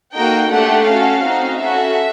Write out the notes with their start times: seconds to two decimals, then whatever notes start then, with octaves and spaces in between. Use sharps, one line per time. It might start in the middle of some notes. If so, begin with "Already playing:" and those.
0.14 A#3 D#4 F#4 A4 G5
0.50 A3 D4 G4 F#5
0.87 C#4 F#4 A4 F5
1.24 C4 D#4 F#4
1.60 C#4 F#4 A4 E5